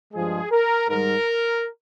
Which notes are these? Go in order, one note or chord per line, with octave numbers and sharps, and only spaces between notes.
G2 F3 G#3 G#4
A#4
G#2 D#3 G3 A#4